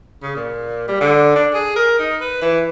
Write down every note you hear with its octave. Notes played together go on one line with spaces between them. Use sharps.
C#3
A#2
G3
D3
D4
G#4
A#4
D#4
B4
E3